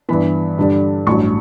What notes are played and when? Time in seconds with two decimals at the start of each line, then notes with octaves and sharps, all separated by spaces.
0.09 G2 E3 B3 B5
0.58 G2 D3 G3 D4
1.07 A1 G2 F#3 C#6